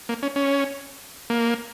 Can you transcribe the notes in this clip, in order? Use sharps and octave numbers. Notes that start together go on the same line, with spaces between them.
A#3
C#4
C#4
A#3